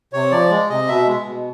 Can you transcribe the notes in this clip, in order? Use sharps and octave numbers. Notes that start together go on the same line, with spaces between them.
C3 C#5
F3 D5
G#3
C3 D#5
B2 E5
G#3
B2